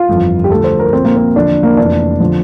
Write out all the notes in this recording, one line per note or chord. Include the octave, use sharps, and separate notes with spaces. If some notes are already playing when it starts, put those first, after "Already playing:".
Already playing: F4
G1 F2 E3
G4
D2 D3 F3 A4
C5
A#4
A#1 A#2 F3 C4
A#3
C4
E2 D3 F3 D4
A#3
F1 F2 E3 D4
D3 F3